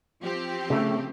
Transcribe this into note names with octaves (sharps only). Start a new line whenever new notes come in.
F3 C4 G4
C#3 A3